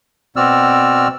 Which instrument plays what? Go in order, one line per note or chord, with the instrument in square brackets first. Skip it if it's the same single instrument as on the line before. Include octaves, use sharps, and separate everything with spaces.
[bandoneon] B2 C4 F#4 D5 E6 F6